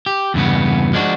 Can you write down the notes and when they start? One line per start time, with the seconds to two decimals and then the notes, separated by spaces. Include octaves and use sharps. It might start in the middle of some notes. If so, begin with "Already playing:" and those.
0.06 G4
0.34 E2 G2 C#3 B3
0.93 F3 G#3 D4 F#4